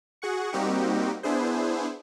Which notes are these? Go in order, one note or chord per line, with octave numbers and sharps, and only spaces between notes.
F#4 G#4 F#5 C#6
G3 A#3 C4 D#4 F#4 G4
B3 D4 E4 G#4 C5